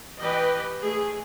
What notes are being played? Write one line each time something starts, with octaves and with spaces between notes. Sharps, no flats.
E3 G4 B4 D#5 G5
A3 G#4